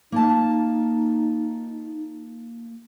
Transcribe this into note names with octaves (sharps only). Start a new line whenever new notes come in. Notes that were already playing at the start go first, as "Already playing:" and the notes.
A#3 D#4 F4 A5